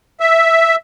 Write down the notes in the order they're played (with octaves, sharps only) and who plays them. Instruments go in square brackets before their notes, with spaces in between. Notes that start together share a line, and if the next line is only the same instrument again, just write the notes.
[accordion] E5